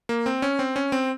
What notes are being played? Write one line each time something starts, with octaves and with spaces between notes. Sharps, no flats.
A#3
C4
C#4
C4
C#4
C4